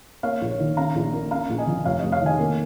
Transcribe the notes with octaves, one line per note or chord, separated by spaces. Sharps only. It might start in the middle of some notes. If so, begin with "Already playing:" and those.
A#3 C#5 F5
A#1
C#5
D#3
C#4 F5 A#5
A#1
A#3
C#4 F5 A#5
A#1
D#5 G#5
F3
F1 C#5 F5
D#5
F1
C#5 F5
D#3 D#5 G#5
A#3